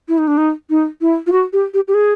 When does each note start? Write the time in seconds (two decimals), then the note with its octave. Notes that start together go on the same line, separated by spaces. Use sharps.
0.08 E4
0.18 D#4
0.27 D4
0.37 D#4
0.70 D#4
1.01 E4
1.27 F4
1.32 F#4
1.53 G4
1.74 G4
1.88 G4
1.94 G#4